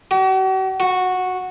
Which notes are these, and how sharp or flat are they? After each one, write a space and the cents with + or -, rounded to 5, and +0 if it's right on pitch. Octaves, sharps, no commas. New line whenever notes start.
F#4 +45
F#4 -10